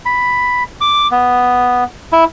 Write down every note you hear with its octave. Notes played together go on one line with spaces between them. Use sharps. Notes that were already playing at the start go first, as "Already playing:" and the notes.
B5
D6
B3
E4